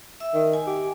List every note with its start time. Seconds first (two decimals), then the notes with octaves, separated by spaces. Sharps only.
0.20 E5 E6
0.34 D#3
0.53 G#5
0.67 G4